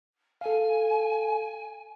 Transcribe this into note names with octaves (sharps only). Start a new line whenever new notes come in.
A4 F5 G#5